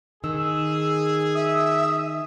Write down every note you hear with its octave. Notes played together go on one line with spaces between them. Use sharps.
D#3 G#4 E6
E5 D#6